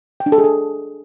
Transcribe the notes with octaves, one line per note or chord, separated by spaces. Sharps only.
G5
D4
A4
G#4
A4